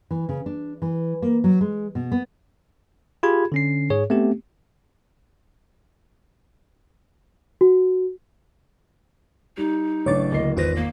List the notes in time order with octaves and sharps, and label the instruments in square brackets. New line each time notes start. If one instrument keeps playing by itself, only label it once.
[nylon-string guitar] E3
C#3
D4
E3
A#3
F#3
G#3
B2
B3
[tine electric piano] F4 G4 G#4 B5 G#6
D3 C#4 C7
G#2 G#4 C#5
A3 B3 C4 G4
[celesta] F#4
[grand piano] G3 [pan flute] D#4
[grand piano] A1 A3 D4 [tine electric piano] C#3 F#3 [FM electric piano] C#5 D6 A6
[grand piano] D1 A#3 C7 [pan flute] D#5
[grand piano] G#1 [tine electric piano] E2 A#6 [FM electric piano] D#4 F4 C5 [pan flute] B4
[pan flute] A#3